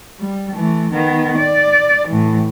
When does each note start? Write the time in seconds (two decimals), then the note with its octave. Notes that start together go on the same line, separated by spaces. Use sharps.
0.20 G3
0.53 E3 A3
0.93 D#3 B3
1.38 D5
2.08 A2 E3